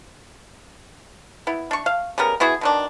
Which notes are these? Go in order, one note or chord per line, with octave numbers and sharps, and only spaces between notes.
B3 E4
D4 C#6
F5
C#3 G3 B3 A#4
B3 E4 F#4 G#4
B2 D#3 D4